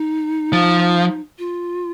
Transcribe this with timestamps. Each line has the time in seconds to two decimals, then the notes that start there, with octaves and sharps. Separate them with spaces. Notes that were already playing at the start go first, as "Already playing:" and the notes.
Already playing: D#4
0.53 F3
1.39 F4